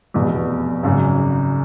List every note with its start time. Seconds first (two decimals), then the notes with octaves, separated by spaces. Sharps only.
0.14 F1 E2 B2
0.83 G#1 F#2 C#3